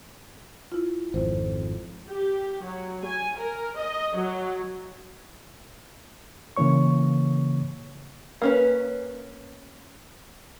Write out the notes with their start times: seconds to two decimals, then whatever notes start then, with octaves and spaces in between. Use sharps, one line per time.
0.72 E4 F4
1.14 G#1 F2 C5
2.10 G4
2.63 F#3
3.05 G#5
3.38 A#4
3.78 D#5
4.15 F#3
6.57 C#3 E3 A#3 C#5 C#6
8.42 A#3 C#4 B4